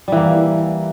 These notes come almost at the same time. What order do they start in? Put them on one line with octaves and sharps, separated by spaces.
G3 E3 A#3